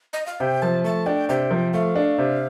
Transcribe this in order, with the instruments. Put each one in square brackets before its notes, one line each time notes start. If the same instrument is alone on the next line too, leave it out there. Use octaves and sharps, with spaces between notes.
[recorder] D#5
F5
[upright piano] C3 [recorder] G5
[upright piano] F3 [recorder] A5
[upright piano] A3 [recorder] A5
[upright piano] D4 [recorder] G5
[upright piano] C3 [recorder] G5
[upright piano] F3
[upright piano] A3 [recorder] F5
[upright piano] D4
C3